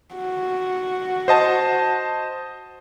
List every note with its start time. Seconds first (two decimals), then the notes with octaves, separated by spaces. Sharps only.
0.15 F#4
1.28 C5 D#5 A5